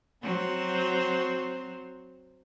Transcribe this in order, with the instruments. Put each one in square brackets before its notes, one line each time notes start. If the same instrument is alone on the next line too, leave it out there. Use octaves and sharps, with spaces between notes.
[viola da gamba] F#3 C4 C5